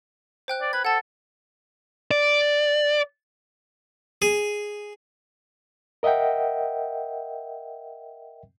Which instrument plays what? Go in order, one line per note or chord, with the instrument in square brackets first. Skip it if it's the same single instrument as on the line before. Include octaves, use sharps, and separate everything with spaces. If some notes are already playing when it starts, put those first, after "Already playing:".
[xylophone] C5 G5 F#6
[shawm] D5
[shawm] B4 [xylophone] G#6
[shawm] A4 [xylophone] F#5 A5
[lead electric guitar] D5
[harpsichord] G#4
[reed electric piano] A#4 D#5 E5 F#5 G5